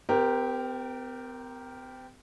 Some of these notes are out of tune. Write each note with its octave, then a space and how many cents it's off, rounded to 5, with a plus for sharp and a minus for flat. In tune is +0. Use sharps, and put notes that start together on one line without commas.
C4 -45 G4 +0 A#4 +0